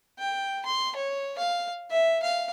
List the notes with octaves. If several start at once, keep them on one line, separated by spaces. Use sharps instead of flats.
G5
C6
C#5
F5
E5
F5